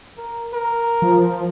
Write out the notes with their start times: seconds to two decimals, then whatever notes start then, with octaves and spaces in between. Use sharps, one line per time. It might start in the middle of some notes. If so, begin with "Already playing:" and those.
0.17 A#4
0.53 A#4
1.02 F3